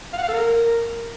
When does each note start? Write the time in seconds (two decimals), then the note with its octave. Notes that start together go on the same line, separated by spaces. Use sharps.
0.13 F5
0.18 F#5
0.23 F5
0.28 A4
0.33 A#4